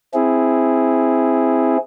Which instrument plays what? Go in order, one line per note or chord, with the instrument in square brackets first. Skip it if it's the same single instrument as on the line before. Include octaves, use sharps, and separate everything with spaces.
[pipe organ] C4 E4 G#4